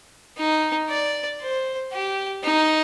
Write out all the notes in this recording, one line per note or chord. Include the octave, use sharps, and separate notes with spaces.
D#4
D5
C5
G4
D#4